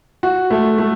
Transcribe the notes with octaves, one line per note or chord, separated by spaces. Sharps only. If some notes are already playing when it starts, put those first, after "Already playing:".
F#4
A3
A3